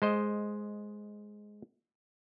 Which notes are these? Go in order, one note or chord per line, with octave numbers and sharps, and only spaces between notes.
G#3 C5 D#5